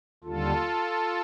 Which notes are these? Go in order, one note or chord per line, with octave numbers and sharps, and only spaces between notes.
D#2 D3 G3 F4 A4